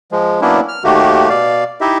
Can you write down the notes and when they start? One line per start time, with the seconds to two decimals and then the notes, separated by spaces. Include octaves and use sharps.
0.12 F3 G#3
0.41 F#3 A#3 B3 C#4 D4 E4
0.68 F6
0.84 D#2 D#3 A3 A#3 F#4 G4
1.29 B2 D5 F5
1.81 D#4 E4 G4 D#5 E5